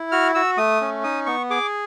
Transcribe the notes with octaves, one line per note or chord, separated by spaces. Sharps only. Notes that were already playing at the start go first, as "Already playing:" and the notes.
Already playing: E4
F#4 F6
F#4 E6
A3 D#6
C#4
D#4 D#6
B3 C#6
G#4 D6